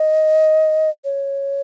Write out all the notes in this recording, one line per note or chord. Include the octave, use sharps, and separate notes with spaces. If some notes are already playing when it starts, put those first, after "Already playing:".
Already playing: D#5
C#5